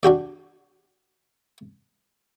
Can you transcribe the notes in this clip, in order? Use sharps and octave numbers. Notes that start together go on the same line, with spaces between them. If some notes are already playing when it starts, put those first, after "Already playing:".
D4 F#4 G4 D5